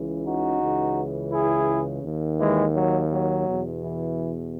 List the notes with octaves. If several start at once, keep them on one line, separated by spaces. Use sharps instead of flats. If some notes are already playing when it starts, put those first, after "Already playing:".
Already playing: C#2 C#3 E3
D#4 F#4
C#2 C#3 E3
E4 G#4
D#2 D#3
E3 G#3
F#3
F#3
E2 B2
E3